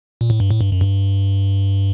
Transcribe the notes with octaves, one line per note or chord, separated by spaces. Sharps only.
A#2
A2
G2
A2
G2
F#2
G2